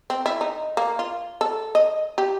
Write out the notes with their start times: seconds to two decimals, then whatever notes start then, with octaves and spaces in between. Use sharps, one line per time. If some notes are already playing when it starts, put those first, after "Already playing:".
0.10 C4
0.26 E4
0.41 D#4
0.77 A#3
0.99 F4
1.41 A4
1.75 D#5
2.18 G4